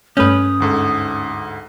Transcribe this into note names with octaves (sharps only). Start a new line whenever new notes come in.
G2 A3 C#4 B4 D#6 G6
D2 G#2 A4